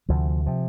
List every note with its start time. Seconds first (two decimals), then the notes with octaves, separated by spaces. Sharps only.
0.08 D2 C3 F3
0.46 C3 F3